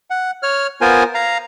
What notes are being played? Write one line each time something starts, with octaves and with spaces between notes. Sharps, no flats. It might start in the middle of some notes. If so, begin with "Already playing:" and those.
F#5
C#5 F6
B3 F4 A#4 C5 G#5
F5 A#5